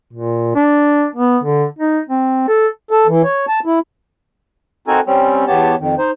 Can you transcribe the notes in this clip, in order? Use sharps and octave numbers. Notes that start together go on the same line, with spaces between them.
A#2
D4
B3
D3
D#4
C4
A4
A4
E3
C#5
A5
E4
C4 D#4 F#4 A4 A#4 G#5
G3 C4 C#4
E2 B3 G4 C#5 A5
F2 D#3
D#4 C5